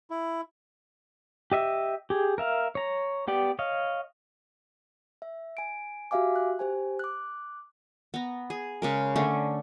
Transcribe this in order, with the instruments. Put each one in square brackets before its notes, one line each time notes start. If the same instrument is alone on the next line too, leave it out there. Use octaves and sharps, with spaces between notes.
[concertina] E4
[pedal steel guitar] G4 D#5 E5
G4 G#4
A#4 E5 F5
C#5 A#5
B3 G4 D5
C#5 D#5 F5
[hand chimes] E5
G#5 D7
F#4 G4 E5 F5 G#5 D6
F#6
G4 C5 G#5
D6 F#6
[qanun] B3 A#5
G#4
C#3 G#3 A#4
D3 A3 C#4